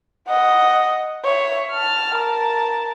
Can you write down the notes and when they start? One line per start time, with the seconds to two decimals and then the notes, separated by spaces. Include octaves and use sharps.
0.28 D#5 F#5
1.25 C#5 E5
1.72 A5 F6
2.17 A#4 A5